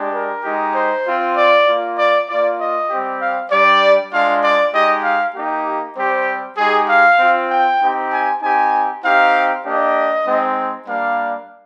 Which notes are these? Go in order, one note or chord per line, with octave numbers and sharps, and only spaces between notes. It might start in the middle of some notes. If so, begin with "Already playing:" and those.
Already playing: G#3 D4 G4
A#4
G#3 D#4 G4
C5
C4 F4
D5
A#3 F4
D5
A#3 F4 D5
D#5
G3 C4 G4
F5
G3 D4 G4 D5
G#3 D4 F4 F5
D5
G#3 D#4 G4 D#5
F5
A#3 D#4 G4
G3 C4 G4 C5
G#3 D#4 G4 G#4
F5
C4 F4
G5
C4 D#4 G4
G#5
C4 D#4 G4 G#5
C4 D#4 G4 F5
A#3 D4 G4 D#5
G#3 C4 D#4
G3 A#3 D4 F5